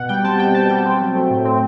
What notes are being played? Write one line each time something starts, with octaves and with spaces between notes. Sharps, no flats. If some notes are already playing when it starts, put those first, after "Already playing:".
Already playing: B2 F#5
G3 G5
C4 A5
B2 G5
B2 A5
G3 G5
C4
F#3
A3
A2
C4